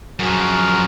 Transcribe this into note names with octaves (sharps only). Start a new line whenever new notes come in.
F#2 F3 F#4 G#4 A#4